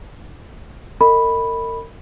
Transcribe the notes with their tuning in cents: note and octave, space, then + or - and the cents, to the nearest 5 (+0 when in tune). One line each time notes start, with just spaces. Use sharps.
A#4 -40 D#5 +0 B5 +0